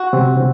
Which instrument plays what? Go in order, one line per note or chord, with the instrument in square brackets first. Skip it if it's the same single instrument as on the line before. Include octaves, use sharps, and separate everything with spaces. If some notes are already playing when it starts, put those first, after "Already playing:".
Already playing: [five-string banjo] F#4
[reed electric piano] C3 C4
C3 C4